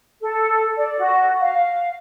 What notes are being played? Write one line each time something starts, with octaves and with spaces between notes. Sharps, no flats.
A4
D5
F#4
F5